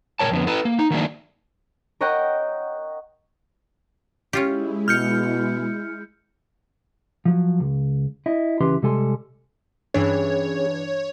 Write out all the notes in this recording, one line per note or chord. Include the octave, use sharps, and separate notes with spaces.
A#2 D#3 A#4 C#5 A5
F2 D3 B3
E4 A4 B4
A#3
D#4
D#3 F#3 A3 A#3 D4
A#4 C#5 D#5 F#5 G5 A#5
G#3 C#4 E4 F4 G4
B2 F6 G6 C#7
F3 F#3
C#2
E4 D#5
C#2 E3 C#4 G4 B4 C6
C3 G3 G#3 A4 G#5 C6
G2 E3 C#4 D4 G#4 C#5